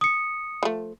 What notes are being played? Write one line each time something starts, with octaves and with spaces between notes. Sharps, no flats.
D#6 C#7
F3 A3